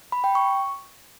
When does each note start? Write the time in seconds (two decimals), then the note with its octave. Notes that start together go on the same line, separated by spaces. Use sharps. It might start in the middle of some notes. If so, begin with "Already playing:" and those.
0.12 B5
0.24 G5
0.35 C#6